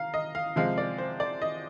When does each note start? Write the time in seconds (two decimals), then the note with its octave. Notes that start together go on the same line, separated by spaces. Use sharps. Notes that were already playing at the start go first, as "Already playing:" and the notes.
Already playing: F5 A#5
0.14 D#5
0.35 F5
0.56 C3 F3 G#3 F5
0.78 D5
0.98 C5
1.20 D5
1.42 D#5